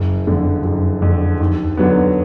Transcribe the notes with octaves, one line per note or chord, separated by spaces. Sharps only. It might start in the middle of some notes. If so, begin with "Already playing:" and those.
Already playing: F#1
F2 D3
F#1
F2 D3
D#2
D3 F#3 B3